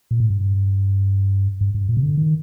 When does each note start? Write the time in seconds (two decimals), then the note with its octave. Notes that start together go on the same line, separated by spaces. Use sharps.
0.11 A#2
0.20 A2
0.30 G2
1.61 G2
1.74 G2
1.89 A#2
1.97 C3
2.02 D3
2.17 D#3